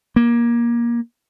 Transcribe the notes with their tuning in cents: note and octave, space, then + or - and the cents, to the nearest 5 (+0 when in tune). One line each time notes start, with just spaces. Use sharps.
A#3 +20